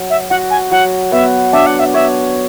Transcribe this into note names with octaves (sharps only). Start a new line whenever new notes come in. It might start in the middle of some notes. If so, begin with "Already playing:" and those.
Already playing: F#3
E5
F#4 F#5
G#5
F#3 F#5
B3 E5
D4 E5
F#5
E5
C#5 E5